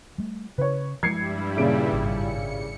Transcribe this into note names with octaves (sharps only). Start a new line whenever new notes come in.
G3 A3
C#3 B4 C#5
G2 F3 G3 G#3 E4 G#6 C7 C#7
A#2 C#3 D7
G#1 C#7